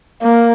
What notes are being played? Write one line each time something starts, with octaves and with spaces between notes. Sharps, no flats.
A#3